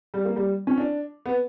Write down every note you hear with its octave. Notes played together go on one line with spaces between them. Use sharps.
G3
A#3
G3
C#4
D4
B3